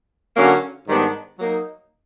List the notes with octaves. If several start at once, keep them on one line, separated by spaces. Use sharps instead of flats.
D3 F#3 A#3 C#4
G#2 D#3 G3 B3 D4
F#3 A#3 D#4